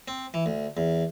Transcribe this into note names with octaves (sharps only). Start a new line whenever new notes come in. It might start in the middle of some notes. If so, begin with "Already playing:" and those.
C4
E3
D2
E2